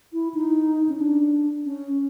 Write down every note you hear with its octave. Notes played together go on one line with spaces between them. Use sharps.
E4
D#4
C#4
D4
C#4